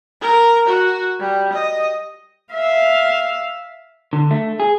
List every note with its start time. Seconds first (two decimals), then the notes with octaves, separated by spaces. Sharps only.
0.21 A#4
0.67 F#4
1.20 G3
1.53 D#5
2.53 E5 F5
4.13 D3
4.31 A3
4.60 G#4